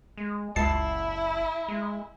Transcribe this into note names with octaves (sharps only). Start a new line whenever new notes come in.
G#3
F#1 C#2 E4 A5 C7
G#3